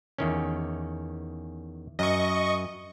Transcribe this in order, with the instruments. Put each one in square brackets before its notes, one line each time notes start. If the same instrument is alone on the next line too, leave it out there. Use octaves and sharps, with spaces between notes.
[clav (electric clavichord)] E2 D#3 C#4
[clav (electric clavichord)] F#2 [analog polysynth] D#5 C#6